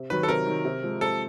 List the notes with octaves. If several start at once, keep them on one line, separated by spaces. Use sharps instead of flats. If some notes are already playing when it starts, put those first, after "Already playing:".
Already playing: C3
D#3 F#3 B4
A4
C3 A#4
D#3 F#3
C3
F3 G#3
C3 A4